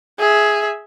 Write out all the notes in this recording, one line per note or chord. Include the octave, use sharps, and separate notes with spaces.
G#4 E5